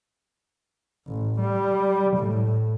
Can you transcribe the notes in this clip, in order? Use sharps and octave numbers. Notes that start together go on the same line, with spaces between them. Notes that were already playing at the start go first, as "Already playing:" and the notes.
A1
G3
A2